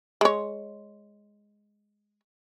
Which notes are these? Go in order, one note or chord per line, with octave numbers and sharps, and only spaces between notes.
G#3 C#5